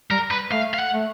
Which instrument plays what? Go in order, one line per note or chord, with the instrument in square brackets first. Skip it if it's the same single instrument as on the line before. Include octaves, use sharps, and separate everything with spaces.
[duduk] G3 [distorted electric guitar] A#4
[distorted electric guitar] B4
[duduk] A3 [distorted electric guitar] F5
[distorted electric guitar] F5
F#5
[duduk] A3